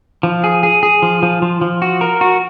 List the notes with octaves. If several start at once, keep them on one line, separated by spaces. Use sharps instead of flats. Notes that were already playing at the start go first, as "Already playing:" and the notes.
F3
G#4
G#4
G#4
F3
F3
F3
F3
F#4
A#4
F#4